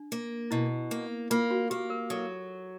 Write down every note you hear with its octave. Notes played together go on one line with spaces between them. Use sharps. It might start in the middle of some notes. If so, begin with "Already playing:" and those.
Already playing: D4
A#3
B2 E4
A#3
A#3 F4
F#4
A#3 G4
A#4
F#3 A4